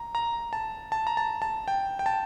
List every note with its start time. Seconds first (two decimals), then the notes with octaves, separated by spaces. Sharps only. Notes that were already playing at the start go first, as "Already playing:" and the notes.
Already playing: A#5
0.15 A#5
0.53 A5
0.92 A5
1.07 A#5
1.17 A5
1.42 A5
1.68 G5
1.99 G5
2.06 A5